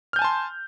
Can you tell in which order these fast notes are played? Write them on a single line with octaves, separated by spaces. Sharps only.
F6 G6 G#5 A5 C6